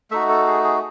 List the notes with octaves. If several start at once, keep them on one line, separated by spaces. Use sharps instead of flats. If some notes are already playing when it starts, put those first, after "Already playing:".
A3 D#4 F#4 E5
A4
G#4
G#4